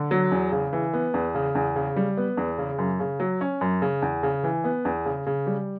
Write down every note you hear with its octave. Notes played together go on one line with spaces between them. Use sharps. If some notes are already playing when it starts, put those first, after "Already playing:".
Already playing: D3
F#3
E2
C#3
E3
B3
E2
C#3
E2
C#3
G3
B3
E2
C#3
F#2
C#3
F#3
C#4
F#2
C#3
E2
C#3
E3
B3
E2
C#3
C#3
G3